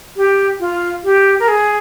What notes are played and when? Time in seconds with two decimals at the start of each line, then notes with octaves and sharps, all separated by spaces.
0.16 G4
0.60 F4
1.04 G4
1.40 A#4
1.48 G#4